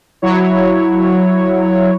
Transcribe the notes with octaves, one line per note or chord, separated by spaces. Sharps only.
F#3 E4 C#5